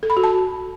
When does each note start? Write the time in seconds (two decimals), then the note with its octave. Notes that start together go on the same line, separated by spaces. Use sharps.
0.03 A4
0.10 B5
0.17 F#4
0.24 A5